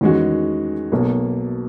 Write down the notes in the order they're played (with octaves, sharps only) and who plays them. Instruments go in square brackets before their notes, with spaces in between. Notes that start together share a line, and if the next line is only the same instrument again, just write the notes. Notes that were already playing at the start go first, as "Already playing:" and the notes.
[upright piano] E2 D#3 G#3 C#4 F#4
B1 B2 A#3